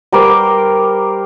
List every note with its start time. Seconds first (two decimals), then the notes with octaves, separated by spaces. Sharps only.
0.12 G3 A#4 C5 D6